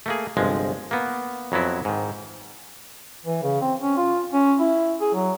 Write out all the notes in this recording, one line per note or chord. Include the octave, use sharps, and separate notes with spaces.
A3 A#3 G#4
G1 C2 F3 G#3
A#3 B3
F2 F#3 B3 E4
G#2 D#3
E3
C#3
C4
C#4
F4
C#4
E4
G#4
F#3